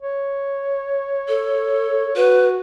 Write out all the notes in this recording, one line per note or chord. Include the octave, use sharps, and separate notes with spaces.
C#5
A4
F#4 B4